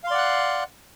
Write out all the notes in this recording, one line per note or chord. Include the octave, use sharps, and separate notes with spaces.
D5 F5 F#5 C6 F#6